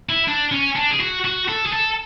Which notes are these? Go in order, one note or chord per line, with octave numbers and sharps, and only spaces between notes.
E4
D4
C#4
D4
G#4
F#4
F#4
A4
G#4
A4